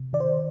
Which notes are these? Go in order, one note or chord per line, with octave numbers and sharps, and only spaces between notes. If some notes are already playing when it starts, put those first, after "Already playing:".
Already playing: C3
D#3 D5
C5